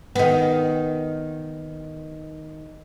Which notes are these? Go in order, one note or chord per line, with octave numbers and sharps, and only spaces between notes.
D#3 B3